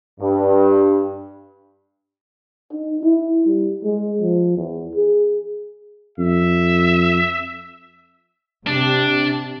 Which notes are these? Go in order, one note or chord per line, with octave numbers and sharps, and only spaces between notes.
G2
D#4
E4
G3
G#3
F3
E2
G#4
F2 E5
C3 D4